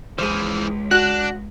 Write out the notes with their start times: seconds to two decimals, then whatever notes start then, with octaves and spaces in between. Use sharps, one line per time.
0.19 C#2 E3 F3 G#4 C5
0.91 D4 F#4 F#6